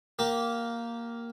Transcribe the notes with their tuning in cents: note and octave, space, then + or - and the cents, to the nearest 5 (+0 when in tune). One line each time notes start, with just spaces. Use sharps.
A#3 +0 G4 -20